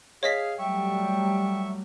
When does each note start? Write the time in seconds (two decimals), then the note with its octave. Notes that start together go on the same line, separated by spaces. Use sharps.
0.23 G#4 C#5 D#5 F5 B6
0.59 F#3 G3 A3 E5 G5 C#6